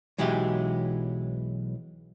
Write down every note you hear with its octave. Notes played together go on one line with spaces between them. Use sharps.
B1 E3 F#3 G#3 E4 G4